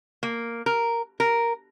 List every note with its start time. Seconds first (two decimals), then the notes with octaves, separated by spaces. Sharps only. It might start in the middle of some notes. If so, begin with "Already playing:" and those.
0.23 A#3
0.66 A#4
1.20 A#4